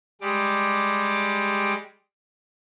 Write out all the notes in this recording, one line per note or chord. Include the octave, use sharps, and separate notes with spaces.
G3 G#3 D6